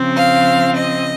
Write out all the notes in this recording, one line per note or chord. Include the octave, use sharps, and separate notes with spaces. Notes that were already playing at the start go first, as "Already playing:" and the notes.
Already playing: C#3 F3 C4
F5
D#5